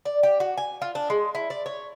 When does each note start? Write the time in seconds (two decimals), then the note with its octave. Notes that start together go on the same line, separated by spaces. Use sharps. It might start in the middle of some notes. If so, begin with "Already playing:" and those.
0.05 D5
0.23 G4
0.40 F#4
0.58 G#5
0.82 F4
0.95 D4
1.10 G#3
1.35 E4
1.50 D5
1.66 C#5